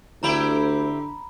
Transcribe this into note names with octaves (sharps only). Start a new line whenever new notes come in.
D2 D3 C4 E4 G4 A#5 B5